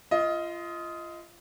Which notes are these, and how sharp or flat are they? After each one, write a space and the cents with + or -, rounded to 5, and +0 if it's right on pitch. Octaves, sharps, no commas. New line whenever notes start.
F4 -25 D#5 +15